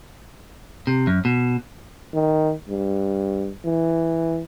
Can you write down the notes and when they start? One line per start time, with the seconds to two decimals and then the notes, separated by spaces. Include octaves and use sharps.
0.87 C3
1.07 F#2
1.25 B2
2.14 D#3
2.70 G2
3.66 E3